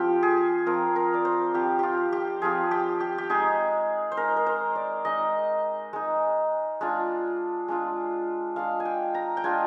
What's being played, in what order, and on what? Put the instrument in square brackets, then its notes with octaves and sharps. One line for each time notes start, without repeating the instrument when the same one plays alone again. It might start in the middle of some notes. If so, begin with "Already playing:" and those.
Already playing: [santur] F3 C4 F4 G4
G#4
F3 C4 F4 A#4
A#4
D5
C5
F3 C4 F4 G4
F4 G4
G4
F3 C4 F4 G#4
G4
G4
G4
G#3 D#4 G#4
C5
G#3 D#4 A#4
A#4
C5
D5
G#3 D#4 D#5
G#3 D#4
G#3 D4 F4
G#3 D4 F4
G#3 D4 F4 F5
G#5
G5
A#5
G5
G#3 D4 F4 G#5